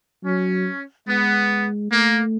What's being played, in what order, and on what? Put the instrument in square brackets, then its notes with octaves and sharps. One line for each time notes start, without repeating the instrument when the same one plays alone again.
[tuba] F#3 [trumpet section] C#4
[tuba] G#3 [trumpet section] B3
[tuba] A3 [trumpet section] A#3